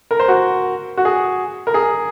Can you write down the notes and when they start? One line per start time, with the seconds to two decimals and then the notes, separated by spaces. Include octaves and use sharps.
0.11 A#4
0.20 C5
0.28 F#4
0.97 F#4
1.05 G#4
1.67 A#4
1.74 G#4